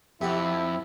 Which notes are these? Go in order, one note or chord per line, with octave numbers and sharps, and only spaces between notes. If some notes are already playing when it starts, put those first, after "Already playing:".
F2 C3 E4 F#5